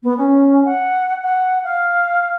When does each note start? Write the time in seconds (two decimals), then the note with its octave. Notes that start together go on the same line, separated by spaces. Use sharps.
0.03 B3
0.17 C#4
0.64 F#5
1.22 F#5
1.63 F5